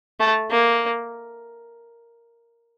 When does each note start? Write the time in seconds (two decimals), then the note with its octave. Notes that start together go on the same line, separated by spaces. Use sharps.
0.20 A3
0.51 A#3